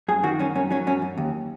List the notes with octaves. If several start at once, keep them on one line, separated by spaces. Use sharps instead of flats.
F#2 G#4
D#3 F#4
F#2 C#4
F#2 C#4
F#3 C#4
F#2 C#4
F#2
D#2